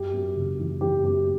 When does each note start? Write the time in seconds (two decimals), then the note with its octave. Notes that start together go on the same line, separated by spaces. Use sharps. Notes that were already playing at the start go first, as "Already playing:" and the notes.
Already playing: F#2 G4
0.13 F#2
0.36 F#1
0.59 E3
0.81 E3 G4
1.04 F#2 G4